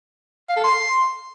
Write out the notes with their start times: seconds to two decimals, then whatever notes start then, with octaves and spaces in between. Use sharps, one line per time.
0.49 F5
0.56 A4
0.64 C6